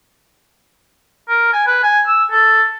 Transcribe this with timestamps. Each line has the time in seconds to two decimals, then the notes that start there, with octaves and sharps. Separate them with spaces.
1.29 A#4
1.53 G#5
1.67 B4
1.83 G#5
2.07 E6
2.31 A4